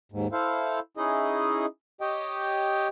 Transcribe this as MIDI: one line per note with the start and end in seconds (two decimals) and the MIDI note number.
0.12 0.27 39
0.12 0.27 44
0.32 0.80 64
0.32 0.80 69
0.32 0.80 72
0.32 0.80 77
0.97 1.66 61
0.97 1.66 63
0.97 1.66 64
0.97 1.66 68
0.97 1.66 75
2.01 2.88 67
2.01 2.88 73
2.01 2.88 75
2.01 2.88 79